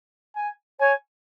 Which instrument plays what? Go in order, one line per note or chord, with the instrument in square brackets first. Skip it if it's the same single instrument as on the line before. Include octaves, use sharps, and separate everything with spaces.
[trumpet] G#5
[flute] C#5 [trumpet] G#5